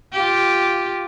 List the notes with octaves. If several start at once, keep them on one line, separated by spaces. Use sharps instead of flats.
F4 G4